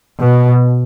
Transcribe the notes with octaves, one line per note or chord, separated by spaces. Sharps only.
B2